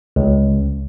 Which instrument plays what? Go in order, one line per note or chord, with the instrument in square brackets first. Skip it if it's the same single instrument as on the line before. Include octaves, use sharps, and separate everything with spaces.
[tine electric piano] C#2